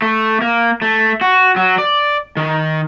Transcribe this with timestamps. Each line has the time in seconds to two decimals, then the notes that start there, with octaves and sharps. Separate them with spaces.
0.02 A3
0.41 A#3
0.82 A3
1.21 F#4
1.56 F#3
1.78 D5
2.37 D#3